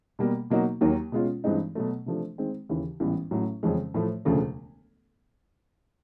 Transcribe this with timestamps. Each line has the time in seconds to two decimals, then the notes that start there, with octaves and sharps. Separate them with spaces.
0.19 B2 G3 A#3
0.50 B2 F#3 A#3 D#4 F#4
0.81 D#2 D#3 F#3 A#3
1.12 B2 G#3 C#4 F4
1.44 G2 E3 G#3 C4 D#4
1.75 B2 F#3 A3
2.06 C3 F3 A3 D4
2.38 D#3 G#3 C4
2.69 D#2 C#3 E3
3.00 A1 G#2 E3 G3 B3
3.31 A1 A2 F#3
3.63 F2 C#3 F3 G#3 C#4
3.94 A2 F3 A3
4.25 E1 D2 C#3 F3 A3